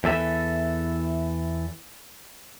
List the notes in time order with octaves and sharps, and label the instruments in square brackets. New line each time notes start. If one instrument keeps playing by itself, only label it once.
[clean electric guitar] E2 E3 A4 E5